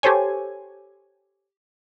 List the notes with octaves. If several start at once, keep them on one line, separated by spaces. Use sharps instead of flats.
G4 A4 C5 C#5 G#5